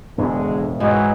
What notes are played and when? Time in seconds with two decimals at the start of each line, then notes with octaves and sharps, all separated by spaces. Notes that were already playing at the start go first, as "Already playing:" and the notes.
0.18 E1 F2 A2 D3 G#3
0.80 G#2 E3 F#3 D#5